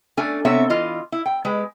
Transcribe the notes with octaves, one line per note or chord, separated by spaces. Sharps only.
A3 C#4 D4 G#5
C3 B3 C4 A4 C#5 E5
E3 F4 D#5
E4
G5
G#3 G4 B4